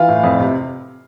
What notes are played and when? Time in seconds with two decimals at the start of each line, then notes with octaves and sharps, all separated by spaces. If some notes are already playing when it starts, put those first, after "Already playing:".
Already playing: E3 F4 F5
0.09 A2
0.23 F2
0.40 C3